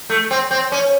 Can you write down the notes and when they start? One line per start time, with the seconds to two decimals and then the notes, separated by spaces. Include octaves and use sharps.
0.10 A3
0.31 C4
0.51 C4
0.72 C#4